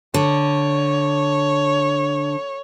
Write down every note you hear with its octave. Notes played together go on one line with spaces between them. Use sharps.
D3 C#5